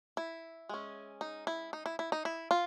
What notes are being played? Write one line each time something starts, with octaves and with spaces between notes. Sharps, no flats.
E4
G#3 C#4
D#4
E4
D#4
E4
E4
D#4
E4
F4